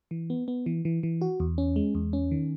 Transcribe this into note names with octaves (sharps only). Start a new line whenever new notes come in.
E3
B3
B3
E3
E3
E3
F#4
E2
C#4
G#3
E2
C#4
D#3